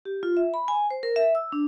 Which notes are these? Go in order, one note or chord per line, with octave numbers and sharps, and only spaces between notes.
G4
F4
E5
B5
G#5
C5
A#4
E5
E6
D4